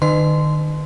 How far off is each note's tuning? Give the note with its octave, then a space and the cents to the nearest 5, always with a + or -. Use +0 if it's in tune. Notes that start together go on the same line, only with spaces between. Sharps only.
D#3 -35 B4 +30 C6 -15